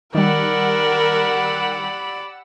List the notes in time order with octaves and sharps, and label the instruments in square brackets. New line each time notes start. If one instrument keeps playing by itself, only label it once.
[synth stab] D#3 G3 [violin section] G4 F#5 E6 [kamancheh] A#4 [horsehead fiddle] D5 B5